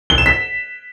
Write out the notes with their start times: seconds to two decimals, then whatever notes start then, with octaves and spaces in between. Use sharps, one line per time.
0.10 G7
0.18 E7
0.26 B6